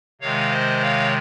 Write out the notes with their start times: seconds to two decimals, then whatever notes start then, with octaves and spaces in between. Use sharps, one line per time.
0.21 C3 D#3 G#3 C#5 F5
0.51 C5 D#5
0.82 C#5 F5